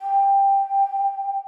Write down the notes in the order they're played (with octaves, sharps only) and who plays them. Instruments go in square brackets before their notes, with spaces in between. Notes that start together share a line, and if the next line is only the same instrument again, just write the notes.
[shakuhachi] G5